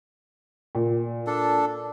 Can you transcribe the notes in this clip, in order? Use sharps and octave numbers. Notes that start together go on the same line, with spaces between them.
A#2
D4 A4